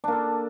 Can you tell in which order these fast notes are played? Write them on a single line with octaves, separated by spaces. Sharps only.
D4 A#3 A4